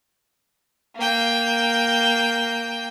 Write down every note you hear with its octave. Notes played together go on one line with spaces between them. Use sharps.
A#3 G5